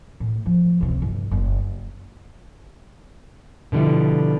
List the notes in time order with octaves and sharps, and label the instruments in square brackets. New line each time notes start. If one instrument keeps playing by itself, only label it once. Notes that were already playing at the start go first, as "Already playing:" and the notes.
[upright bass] A2
F3
C#2 C3
G1
F#1
[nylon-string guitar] B2 D3 F3 G3 E4